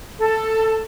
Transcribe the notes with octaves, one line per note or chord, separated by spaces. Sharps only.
A4